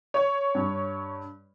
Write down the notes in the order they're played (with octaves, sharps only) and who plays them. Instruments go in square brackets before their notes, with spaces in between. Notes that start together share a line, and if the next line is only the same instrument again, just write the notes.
[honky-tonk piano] C#5
[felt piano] G2